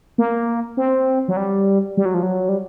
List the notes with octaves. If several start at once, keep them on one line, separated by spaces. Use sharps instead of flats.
A#3
C4
F#3
G3
G3
F#3
F3
F#3
G3